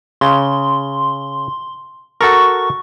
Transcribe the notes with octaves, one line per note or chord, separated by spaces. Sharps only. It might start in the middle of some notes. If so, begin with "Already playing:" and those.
C#3 C6
F#4 A4 A#4 C#6